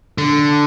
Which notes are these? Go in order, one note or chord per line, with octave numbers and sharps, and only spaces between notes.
D3